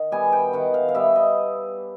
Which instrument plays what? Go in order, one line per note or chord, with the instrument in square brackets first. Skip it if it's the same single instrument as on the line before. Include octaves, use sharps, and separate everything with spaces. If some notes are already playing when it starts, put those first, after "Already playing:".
Already playing: [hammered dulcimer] D#3
G3 B3 G#5
G5
D#3 F#5
F5
F5
G3 B3 E5
D#5